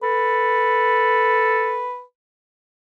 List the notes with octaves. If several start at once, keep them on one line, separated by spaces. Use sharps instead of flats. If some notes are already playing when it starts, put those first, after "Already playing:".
A4 B4